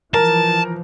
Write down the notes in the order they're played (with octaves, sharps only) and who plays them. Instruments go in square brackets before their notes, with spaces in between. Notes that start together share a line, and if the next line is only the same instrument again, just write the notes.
[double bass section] E3 F3 [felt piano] A#4 [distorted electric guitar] A5